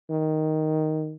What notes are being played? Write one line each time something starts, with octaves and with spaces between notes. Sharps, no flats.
D#3